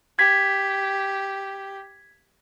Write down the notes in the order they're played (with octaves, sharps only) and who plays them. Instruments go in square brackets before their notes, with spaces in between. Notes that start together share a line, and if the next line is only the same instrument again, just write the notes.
[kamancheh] G4 [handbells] G#6 B6